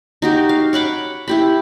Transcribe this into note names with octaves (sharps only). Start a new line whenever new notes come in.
D#4 F#4 G4
F5
C#5 F#5 B5 D6
E4 G4 B5